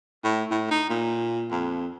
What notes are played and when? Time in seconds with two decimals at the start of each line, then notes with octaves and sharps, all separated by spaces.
0.24 A2
0.51 A2
0.71 D#4
0.89 A#2
1.51 F2